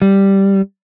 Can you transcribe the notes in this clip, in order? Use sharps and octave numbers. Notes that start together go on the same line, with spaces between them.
G3